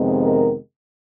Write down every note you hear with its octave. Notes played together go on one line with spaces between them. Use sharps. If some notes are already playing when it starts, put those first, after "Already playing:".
Already playing: F2 C3 D#3 G#3 B3
A#4